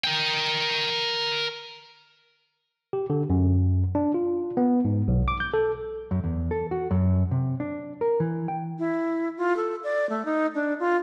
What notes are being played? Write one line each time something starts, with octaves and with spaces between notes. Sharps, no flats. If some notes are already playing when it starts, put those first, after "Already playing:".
A#4 G5
G4
D3
F#2
D4
F4
B3
G#2
B1
D6
G6
A4
F#2
E2
A4
F#4
F#2
C3
D4
A#4
E3
G5
E4
F4
A4
D5
A3
D#4
D4
F4